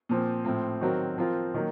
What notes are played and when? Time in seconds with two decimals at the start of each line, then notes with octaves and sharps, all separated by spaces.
0.09 A#2 F3 C4
0.45 A2 F3 C4
0.81 D#3 F#3 C4 F#4 A#4
1.18 F3 C4 F4 A#4
1.54 D#3 F#3 A#3